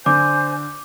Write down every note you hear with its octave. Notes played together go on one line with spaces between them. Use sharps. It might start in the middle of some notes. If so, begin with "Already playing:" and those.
D3 C5 G#5 D6 G6